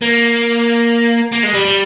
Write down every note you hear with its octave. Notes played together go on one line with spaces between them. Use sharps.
A#3
A#3
G#3
G3
G3